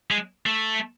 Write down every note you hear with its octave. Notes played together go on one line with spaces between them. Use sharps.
G#3
A3